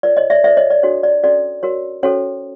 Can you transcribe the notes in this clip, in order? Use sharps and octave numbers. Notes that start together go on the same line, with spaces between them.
F4 A#4 C#5 D5
C#5 D#5
D5 E5
F4 A4 C5 D5 E5
C#5 D#5
D5
D4 F#4 A4 C#5
D5
C#4 F#4 A4 D5
F#4 A#4 C#5
C#4 F#4 A4 C5 C#5